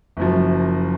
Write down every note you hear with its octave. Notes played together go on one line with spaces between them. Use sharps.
F#1 F#2 F3